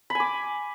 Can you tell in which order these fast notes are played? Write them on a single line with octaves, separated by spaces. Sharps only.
B5 G#5 D6